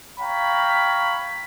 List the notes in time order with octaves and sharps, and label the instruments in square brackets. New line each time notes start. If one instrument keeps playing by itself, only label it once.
[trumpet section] C#5 F5 G5 A#5 B5